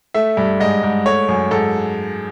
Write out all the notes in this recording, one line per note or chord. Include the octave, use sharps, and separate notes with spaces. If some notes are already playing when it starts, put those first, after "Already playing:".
A3 E5
G2
G#2 D#5
G#2
A3 C#5
F#2
G#2 A4